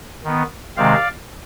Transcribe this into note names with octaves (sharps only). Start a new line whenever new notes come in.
D#3 B3
C3 D#3 G#3 C4 D5 F5